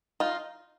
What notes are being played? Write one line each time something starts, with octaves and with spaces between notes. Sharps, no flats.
D#4 F4